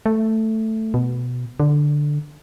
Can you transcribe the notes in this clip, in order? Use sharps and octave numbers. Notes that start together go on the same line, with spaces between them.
A3
B2
D3